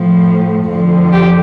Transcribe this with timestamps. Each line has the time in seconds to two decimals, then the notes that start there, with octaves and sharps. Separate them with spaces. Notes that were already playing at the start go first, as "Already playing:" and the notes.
Already playing: A2 F3
0.67 F2 D3 F3
1.11 G4